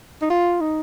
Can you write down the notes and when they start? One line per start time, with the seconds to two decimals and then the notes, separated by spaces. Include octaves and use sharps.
0.22 D#4
0.30 F4
0.61 D#4